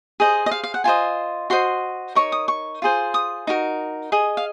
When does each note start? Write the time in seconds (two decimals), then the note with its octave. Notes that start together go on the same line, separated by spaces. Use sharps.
0.20 G#4 C5 D#5
0.46 D#5
0.51 F5
0.64 F5
0.74 F#5
0.84 F4 C5 D#5 G#5
1.50 F#4 C5 D#5 C6
2.15 D#4 A#4 C#5 C#6
2.32 D#6
2.48 C#6
2.82 F4 G#4 C5
3.14 D#6
3.47 D#4 F#4 A#4
4.12 G#4 D#5
4.37 F5